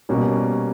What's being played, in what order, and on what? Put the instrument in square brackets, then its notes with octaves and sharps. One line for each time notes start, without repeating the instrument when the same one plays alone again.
[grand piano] B2 G3 A#3 C#4